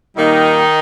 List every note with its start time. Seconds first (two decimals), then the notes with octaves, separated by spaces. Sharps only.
0.16 A#2 D#3 G3 A#3 D#4